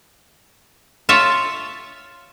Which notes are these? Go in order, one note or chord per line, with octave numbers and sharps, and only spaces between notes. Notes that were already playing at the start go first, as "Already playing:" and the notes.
F4 C#5 E5 A5